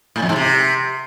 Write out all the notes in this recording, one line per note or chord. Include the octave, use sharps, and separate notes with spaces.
A2
F2
G#2
C3